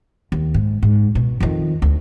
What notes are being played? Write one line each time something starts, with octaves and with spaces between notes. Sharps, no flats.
D#2
G#2
G#2
B2
F2 D#3
D2